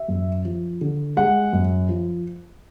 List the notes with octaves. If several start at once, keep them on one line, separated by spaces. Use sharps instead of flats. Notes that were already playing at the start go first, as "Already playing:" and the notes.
Already playing: E5
F#2
F3
D3
G#3 F#5
F#2
F3